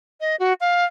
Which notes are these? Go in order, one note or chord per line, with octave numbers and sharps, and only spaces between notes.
D#5
F#4
F5